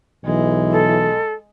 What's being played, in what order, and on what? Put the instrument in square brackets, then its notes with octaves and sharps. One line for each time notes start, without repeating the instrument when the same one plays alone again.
[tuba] B1 [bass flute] E3 [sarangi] G#3
[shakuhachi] A4